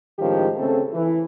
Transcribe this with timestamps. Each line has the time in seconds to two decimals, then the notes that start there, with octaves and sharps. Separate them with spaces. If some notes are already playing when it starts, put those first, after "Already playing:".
0.19 A2 D#3 F3 G#3 C#4 G4
0.56 C#3 A3 C4 A4
0.93 E3